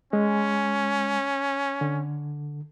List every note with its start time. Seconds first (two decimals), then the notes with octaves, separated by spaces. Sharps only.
0.13 G#3 C#4
1.81 D3